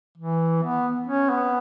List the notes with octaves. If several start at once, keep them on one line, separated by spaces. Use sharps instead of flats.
E3
B3
C#4
B3